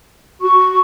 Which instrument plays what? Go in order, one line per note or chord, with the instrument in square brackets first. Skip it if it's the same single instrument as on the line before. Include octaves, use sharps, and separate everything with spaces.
[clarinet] F#4 [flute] C#6